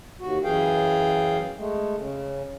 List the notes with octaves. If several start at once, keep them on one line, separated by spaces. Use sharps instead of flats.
D#2 F#4
F#2 E3 G#4 F5 G5
G#3 A3
C#3